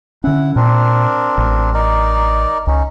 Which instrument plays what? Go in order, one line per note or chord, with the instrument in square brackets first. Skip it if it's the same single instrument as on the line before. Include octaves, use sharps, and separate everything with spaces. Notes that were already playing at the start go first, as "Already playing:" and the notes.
[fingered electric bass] D3 C#4 [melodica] E4 F#5
[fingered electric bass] A#2 [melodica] C4 D4 A#4
[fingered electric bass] A1
[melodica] D#4 A#4 D5
[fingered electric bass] C#2 [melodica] C#4 D#4